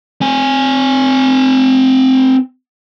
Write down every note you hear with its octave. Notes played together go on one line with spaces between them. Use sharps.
C4 G#5